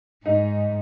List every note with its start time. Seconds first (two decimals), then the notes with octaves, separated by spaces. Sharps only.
0.25 G#2 D#4